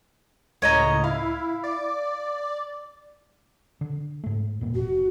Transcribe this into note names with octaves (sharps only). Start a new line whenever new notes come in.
C#2 A2 C#5 D#5 A#5
E4 F5
D5
D3
G#2 A3
E2 A#2 A#3
F1 F#4